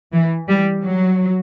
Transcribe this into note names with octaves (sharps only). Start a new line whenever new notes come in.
E3
G3
F#3